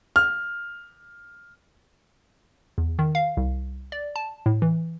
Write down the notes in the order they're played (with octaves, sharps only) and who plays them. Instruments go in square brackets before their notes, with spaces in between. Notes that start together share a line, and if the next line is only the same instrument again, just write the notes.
[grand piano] F6
[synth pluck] E2
D#3
F5
C2
D5
A5
A2
E3